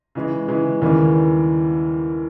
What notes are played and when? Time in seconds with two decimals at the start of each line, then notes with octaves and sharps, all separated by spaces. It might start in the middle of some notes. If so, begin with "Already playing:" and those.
0.15 C#3 E3 G#3
0.48 C#3 E3 G#3
0.82 D#2 C#3 E3 G3 A#3